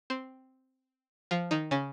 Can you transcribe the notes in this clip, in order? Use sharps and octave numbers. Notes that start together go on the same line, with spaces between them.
C4 C5
F3 F4
D#3 D#4
C#3 C#4